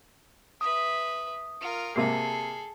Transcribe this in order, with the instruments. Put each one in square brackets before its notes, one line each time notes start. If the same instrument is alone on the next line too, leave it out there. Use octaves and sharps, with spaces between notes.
[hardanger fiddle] B4 E5 [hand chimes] D#6
[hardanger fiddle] F4 A#4
[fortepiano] C3 A#3 [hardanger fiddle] G#4 A4 [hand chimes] C7